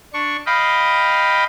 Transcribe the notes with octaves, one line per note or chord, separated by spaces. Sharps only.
D4 C#6
D#5 F5 G5 B5